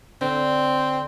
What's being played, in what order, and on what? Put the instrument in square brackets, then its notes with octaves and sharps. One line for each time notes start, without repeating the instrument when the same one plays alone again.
[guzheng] D3 [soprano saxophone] C4